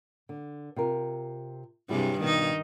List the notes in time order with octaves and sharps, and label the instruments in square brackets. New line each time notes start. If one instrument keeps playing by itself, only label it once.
[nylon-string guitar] D3
C3 F4 A#4
[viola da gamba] G2 C3 G3 [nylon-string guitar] F#3 E4 G#4
[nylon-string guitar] G2 B2 [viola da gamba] D#3 D#4